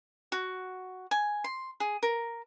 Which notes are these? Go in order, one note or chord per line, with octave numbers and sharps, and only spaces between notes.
F#4
G#5
C6
G#4
A#4